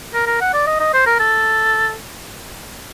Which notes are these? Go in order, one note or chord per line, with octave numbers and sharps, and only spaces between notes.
A#4
A#4
F#5
D5
D#5
D#5
C5
A#4
A4